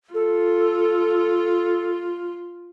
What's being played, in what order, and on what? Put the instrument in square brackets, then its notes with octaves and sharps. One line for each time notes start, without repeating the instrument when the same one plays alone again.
[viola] F4 [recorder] A4